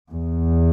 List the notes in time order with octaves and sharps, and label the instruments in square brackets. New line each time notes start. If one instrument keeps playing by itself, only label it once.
[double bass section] E2